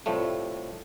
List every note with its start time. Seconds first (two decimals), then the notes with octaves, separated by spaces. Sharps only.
0.06 C2 A2 F3 G3 A3